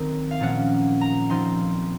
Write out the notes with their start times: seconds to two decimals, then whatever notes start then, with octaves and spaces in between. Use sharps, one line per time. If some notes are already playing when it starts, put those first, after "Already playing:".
Already playing: D#3 F#3 C4 D#4 A#4
0.31 F5
0.40 A#2 F3 A#3 C#4 F#5
1.01 A#5
1.30 F3 C4 D#4 C6